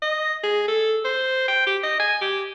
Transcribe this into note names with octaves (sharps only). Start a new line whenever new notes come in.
D#5
G#4
A4
C5
G5
G4
D#5
G#5
G4